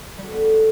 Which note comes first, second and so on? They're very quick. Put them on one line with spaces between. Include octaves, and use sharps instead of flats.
G3 F#4 A4 B3